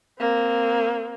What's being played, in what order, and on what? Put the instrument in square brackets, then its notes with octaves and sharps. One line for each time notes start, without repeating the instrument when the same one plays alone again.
[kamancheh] A#3 C4